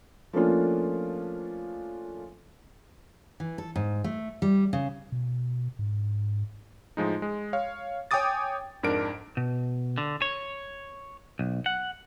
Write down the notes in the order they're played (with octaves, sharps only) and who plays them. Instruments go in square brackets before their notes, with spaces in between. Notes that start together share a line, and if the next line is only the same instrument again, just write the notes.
[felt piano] F3 A3 A#3 C#4 D4 F4
[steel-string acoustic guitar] E3
A4
G#2
A3
G3
C#3
[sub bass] B2
G#2
[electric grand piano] A2 F3 G#3 D#4
G#3
C#5 F5
C#5 G5 G#5 D6 D#6 A6
F2 G#2 D4 A#4 D7
[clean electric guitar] B2
D3
C#5
B1
F#5